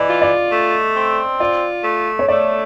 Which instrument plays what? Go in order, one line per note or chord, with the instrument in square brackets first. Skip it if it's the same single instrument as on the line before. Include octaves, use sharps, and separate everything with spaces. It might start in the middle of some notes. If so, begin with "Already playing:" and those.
Already playing: [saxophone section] E3 [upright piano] D5 D#5
[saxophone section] F4
[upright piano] D5
[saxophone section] A3
C4
[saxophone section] F4 [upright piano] D5
[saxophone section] A3
[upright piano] C#5
[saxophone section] A3 [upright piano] D5